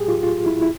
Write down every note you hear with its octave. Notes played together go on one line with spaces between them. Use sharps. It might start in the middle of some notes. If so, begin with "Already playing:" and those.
Already playing: A2 F#3 G4 G#4
F4
F4
E4
E4